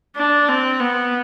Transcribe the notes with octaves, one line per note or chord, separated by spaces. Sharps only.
D4
C4
B3